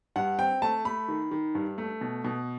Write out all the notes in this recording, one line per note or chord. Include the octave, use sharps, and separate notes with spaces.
G2 F#5
C4 G5
A3 A5
A3 B5
D#3
D#3
G2
A3
B2
B2